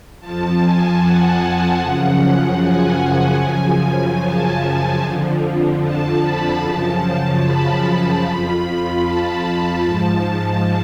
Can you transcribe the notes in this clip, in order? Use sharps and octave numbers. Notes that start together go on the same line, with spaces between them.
F2 F3 A5
G#5
F#5
F#2 C#3 F3
G#5
F#2 C#3 F3
A5
F2 D3 F3
A5
B5
F#2 C#3 F3 A5
B5
B5
F2 F3 B5
A5
G#2 F3